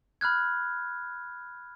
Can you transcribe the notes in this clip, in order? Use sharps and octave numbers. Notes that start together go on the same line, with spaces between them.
B5 F6 F#6 G#6